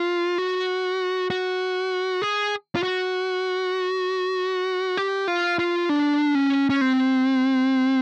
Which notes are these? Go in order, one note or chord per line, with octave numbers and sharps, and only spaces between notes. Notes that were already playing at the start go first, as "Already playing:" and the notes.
Already playing: F4
F#4
F#4
G#4
F4
F#4
G4
F4
F4
D4
C#4
C#4
C4